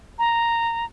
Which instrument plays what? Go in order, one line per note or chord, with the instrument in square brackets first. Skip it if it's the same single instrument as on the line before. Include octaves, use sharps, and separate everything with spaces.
[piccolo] A#5